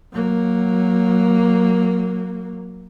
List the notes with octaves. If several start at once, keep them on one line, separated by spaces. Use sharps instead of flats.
F#3 A#3